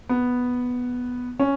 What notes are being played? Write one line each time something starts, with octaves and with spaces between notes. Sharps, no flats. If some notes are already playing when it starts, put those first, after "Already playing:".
B3
C#4